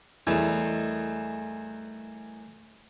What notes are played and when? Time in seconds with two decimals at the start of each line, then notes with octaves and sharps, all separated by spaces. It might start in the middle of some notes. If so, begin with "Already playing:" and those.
0.27 E2 A2 D#3 G3